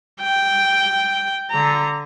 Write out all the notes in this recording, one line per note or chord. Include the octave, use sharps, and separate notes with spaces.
G5
D3 A#5